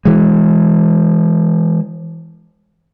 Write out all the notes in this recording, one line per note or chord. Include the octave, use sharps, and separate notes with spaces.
E3 G#3